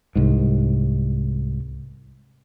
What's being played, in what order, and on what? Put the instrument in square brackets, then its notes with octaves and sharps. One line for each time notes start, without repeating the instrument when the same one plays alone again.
[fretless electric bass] C2 G#2